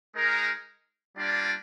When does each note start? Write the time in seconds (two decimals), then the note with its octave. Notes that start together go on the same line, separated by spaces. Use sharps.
0.14 G#3 D#4 A#4
1.17 G3 A#3 D4 F4